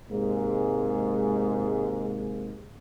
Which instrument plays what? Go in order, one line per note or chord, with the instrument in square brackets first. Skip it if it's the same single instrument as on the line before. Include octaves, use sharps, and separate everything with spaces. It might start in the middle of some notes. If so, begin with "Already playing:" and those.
[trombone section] G#2 C3 G#3 A#3